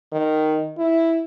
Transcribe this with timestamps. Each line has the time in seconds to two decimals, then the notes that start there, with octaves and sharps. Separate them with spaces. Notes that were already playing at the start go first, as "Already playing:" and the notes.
0.12 D#3
0.78 E4